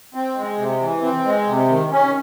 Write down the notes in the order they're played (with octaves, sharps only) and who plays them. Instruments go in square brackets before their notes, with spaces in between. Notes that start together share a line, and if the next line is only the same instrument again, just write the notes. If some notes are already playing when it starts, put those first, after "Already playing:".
[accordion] C4
G#3
C3
E3
C4
G#3
C3
D#3
C#4